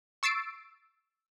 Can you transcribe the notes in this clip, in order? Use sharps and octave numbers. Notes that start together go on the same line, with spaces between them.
C#6 E6 A6 C7 D7